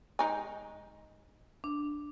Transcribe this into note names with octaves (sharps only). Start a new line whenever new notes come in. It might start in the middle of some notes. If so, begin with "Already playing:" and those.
G#3 D#4 G#5
D4